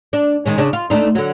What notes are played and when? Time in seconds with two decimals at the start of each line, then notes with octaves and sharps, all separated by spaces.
0.13 D4
0.45 D#3 G#3 C#4
0.58 C#3 C#4 D4
0.73 F4
0.90 A3 D4 D#4
1.15 D3 F#3